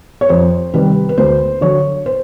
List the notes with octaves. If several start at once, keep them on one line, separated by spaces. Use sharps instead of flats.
C#5
F2 C5
C3 D#3 G3 B4
B4
D2 C5
D3 F#3 C#5
C5